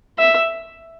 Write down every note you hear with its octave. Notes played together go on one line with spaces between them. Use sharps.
E5